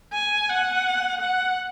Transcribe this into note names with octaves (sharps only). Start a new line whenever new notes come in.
G#5
F#5
F#5